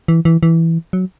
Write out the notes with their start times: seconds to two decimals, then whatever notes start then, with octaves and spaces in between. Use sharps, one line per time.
0.08 E3
0.25 E3
0.43 E3
0.93 F#3